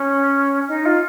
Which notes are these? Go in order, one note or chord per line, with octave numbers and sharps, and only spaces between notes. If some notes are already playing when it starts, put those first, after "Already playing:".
Already playing: C#4
D#4
F4